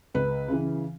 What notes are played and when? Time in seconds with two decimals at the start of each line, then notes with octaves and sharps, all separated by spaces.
0.14 C#2 B4
0.48 C#3 E3